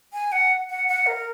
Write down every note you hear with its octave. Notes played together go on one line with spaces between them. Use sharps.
G#5
F#5
F#5
F#5
A#4